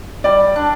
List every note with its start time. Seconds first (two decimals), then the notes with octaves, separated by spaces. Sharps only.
0.24 G3 D5
0.56 D4